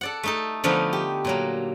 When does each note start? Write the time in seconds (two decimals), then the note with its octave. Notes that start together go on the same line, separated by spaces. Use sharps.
0.01 A4 D5 F#5
0.23 A3 D#4 A4
0.64 D3 F3 A3 B3 D#4
0.93 G4
1.25 A#2 F#3 A#3